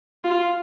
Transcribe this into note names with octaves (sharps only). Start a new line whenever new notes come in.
F4